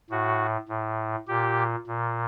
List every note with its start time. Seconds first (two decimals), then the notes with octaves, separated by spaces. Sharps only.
0.10 A2 F#4
0.69 A2
1.28 A#2 G4
1.87 A#2